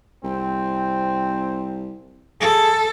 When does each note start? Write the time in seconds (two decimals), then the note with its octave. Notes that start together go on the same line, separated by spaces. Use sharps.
0.24 C2 C4
2.41 G#4 A4